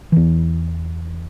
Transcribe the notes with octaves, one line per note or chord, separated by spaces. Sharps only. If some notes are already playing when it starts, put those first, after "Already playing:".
E2 E3